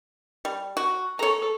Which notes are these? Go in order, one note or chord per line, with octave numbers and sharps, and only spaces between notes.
G3
F#4
A4 C#5 A#5